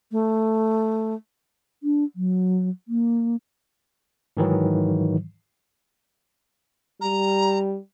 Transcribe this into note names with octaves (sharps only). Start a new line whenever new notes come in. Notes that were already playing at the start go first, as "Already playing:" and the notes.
A3
D4
F#3
A#3
G#2 D#3 E3 F#3
G3 A#5